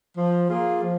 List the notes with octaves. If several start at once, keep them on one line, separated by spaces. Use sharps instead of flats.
F3
A#3 F4 G#4
F3